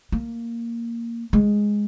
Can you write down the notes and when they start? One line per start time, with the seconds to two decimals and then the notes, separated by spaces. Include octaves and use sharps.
0.12 A#3
1.33 G#3